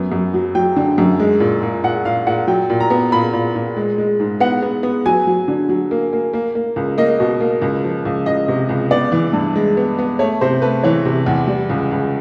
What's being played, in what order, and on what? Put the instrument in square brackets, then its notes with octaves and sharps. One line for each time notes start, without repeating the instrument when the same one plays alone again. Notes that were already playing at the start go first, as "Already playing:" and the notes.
Already playing: [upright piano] F#2 B3
F#2
F#3
F#3 G5
D3
F#2
G#3
A#2
A#2
A#2 F#5
A#2 F5
A#2 F#5
F#3 G5
A#2
A#5
B3
A#2 B5
A#2
A#2
G#3
G#3
G#2
B3 F#5
B3
B3
F#3 G#5
F#3
D3
F#3
A#3
A#3
A#3
A#3
C#2
A#3 D#5
B2
A#3
C#2
F3
C#2
C#2 D#5
C3
C#2
B3 D5
E3
G2
G#3
B3
B3
A3 C#5
C3 C5
A3 B4
E3 C#5
C3
E2
G3
C#2
C#2